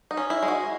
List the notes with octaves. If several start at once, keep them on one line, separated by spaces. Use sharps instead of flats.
D#4
C#4
E4
G#3
F#4